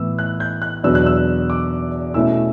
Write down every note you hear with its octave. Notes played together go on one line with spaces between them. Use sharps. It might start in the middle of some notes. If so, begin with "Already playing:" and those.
Already playing: A2 E3 B3 E4 E6
F#6
G6
F#6
E2 B2 F#3 B3 D4 E6
F#6
E6
D6
B2 A3 C#4 E4 E6